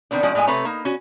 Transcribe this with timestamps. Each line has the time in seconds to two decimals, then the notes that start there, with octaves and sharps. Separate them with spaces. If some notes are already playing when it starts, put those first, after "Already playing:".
0.11 D#3 B3 C4 D4
0.23 F3 G#3 C#4 D5
0.35 A2 G#3 D#5 G#5
0.47 C3 A3 C4 B4 C#5 A#5
0.65 A#3 D#4
0.85 C#4 F#4